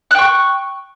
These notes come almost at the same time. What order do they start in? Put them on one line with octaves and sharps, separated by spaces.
F#6 G5 C#6